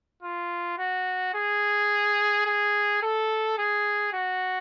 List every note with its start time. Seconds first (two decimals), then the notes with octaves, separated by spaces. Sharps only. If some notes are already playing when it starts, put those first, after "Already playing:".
0.23 F4
0.79 F#4
1.34 G#4
2.46 G#4
3.03 A4
3.58 G#4
4.13 F#4